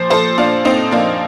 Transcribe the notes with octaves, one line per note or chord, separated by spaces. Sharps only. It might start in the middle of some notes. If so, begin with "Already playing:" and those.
Already playing: A#2 F3 C5
F3 A4 C5
A#2 D4 F4
A#2 C4 D#4
F3 A#3 D4